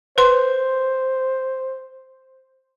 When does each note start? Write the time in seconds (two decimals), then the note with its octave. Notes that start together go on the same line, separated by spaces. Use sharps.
0.18 B4 C5 C6